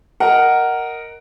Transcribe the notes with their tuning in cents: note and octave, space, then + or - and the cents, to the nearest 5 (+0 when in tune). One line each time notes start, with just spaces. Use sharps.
A#4 +0 D#5 +0 F#5 +10